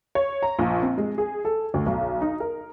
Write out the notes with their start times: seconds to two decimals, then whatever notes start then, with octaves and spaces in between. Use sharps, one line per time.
0.15 C#5
0.43 A#5
0.59 A#1
0.82 C4
0.98 G#3
1.18 G#4
1.45 A4
1.74 D2
1.86 B1
2.22 D#4
2.40 A#4